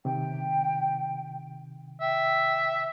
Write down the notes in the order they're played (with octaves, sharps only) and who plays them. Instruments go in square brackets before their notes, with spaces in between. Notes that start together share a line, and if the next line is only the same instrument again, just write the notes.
[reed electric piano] C3 D#3 [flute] G5
[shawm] E5 [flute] G5